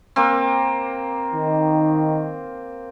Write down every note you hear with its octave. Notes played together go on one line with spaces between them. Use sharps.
A#3 C4
D#3